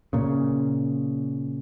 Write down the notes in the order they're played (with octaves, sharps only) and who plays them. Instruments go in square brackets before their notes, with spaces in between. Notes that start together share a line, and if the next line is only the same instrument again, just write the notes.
[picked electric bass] A#2 C#3